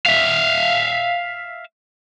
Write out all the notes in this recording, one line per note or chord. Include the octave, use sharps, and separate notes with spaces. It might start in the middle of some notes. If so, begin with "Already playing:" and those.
E5 F5